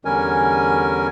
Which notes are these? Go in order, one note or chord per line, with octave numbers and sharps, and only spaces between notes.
E2 D3 G3 C#4 A#4 G#5